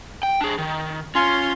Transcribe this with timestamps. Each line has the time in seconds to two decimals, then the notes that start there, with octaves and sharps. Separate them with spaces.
0.23 G5
0.41 D4 G#4
0.58 D#3
1.15 C#4 F4 C6